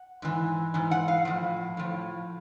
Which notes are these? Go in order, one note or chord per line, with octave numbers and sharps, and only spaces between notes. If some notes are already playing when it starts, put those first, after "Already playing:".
Already playing: F#5
G#2 E3
G#2 E3
F#5
F5
A2 F3
A2 F3